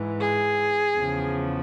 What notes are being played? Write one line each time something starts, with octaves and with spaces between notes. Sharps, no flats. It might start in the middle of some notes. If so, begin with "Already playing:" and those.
Already playing: G#2 E3
G#4
E2 C#3 F3